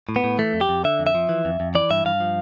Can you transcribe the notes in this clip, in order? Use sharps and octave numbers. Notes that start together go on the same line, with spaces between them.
A2
B3
A2
E3 A3
F2
G4
F2
D3 E5
F2
E5
F3
E3
F2
F2
E3 D5
G2 E5
G2 F5
F3